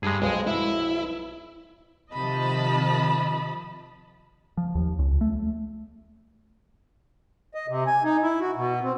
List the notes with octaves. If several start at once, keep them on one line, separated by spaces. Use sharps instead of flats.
G2 G#3 G#4
B1 F2 G#3
E4
C3 D#3 F3 D#5 A5 B5
F3
D#2
C#2
A3
D#5
C3
G#5
D#4
E4
F#4
B2
C4